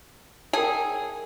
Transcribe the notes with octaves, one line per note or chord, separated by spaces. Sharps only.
G#4 A#4 G5 A5